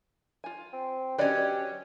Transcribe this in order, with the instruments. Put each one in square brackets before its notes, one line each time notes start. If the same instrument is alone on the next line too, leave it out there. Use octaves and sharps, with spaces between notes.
[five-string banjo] F4 G#5
[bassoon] C4
[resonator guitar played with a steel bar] F#3 C#4 [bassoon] G4 [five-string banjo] B4 D5 D#5